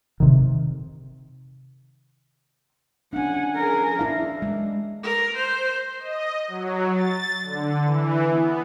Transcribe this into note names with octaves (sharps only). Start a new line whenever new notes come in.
C3 D#3
C#4 D4 F#5 G#5
G#4 A#4
D4 E4 F5
G#3
A#4
C5
D#5
F#3
A6
D3
E3
B3